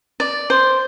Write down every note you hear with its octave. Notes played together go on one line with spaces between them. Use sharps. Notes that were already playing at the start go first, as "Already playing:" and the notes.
D5
C5